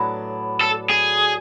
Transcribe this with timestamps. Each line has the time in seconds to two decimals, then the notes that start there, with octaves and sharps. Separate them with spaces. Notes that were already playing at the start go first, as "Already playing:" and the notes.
Already playing: A2 F#3 B3 D4
0.61 A4
0.90 G#4